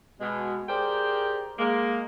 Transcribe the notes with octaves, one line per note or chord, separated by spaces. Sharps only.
B2 G#3
G4 G#4 A#4 C5 D5 G5
G#3 A#3